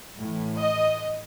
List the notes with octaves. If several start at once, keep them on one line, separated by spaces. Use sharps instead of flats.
A2 E3
D#5